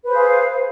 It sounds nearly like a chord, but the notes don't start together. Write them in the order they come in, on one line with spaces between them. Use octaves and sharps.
B4 C5 G#4 F5